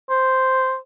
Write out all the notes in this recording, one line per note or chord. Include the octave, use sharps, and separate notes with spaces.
C5